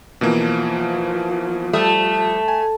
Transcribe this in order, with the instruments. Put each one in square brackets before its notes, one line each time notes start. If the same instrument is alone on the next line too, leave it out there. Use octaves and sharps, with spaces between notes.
[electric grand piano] B2 E3 A#3 [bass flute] F3
[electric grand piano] G3 D#6 [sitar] A3
[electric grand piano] G#5